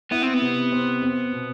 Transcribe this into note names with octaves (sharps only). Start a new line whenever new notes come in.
B3 E4
C4
B3
C3
C4
C4
B2